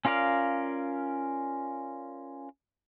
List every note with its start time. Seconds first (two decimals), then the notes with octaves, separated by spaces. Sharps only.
0.05 C#4 F4 A#4 D5 F5